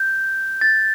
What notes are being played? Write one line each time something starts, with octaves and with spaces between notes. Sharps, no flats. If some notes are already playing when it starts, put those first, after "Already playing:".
Already playing: G6
A6